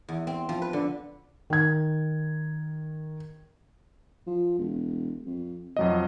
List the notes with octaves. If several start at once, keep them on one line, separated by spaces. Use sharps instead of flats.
E2
C4
F3
B4
D3
D#3 G#6
F3
E1
F2
F1 F2 F#3 D#5